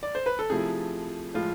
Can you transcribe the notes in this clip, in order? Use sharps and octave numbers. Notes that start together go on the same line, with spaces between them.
D5
C5
B4
A4
C3 F3 A3 E4 G#4
A2 F3 G#3 F4